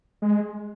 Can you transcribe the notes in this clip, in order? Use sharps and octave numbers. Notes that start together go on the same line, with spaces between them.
G#3